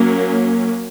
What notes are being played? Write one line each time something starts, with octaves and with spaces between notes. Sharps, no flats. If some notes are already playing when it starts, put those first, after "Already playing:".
Already playing: F#3 A#3 C#4 A#4